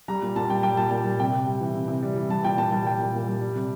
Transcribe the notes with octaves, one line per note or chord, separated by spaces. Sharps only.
G3 A#5
A#2
A#2 A5
G3 G5
G3 G5
A#2 A5
A#2 A5
G3
C3 G5
C3
G3
E3
C3
C3
G3
E3
G3 A5
A#2 G5
A#2 A5
G3 A5
G3 G5
A#2
A#2
G3
G3
C3